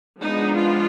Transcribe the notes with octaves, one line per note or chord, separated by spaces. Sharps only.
F3 G#3 B3 D4 D#4
F4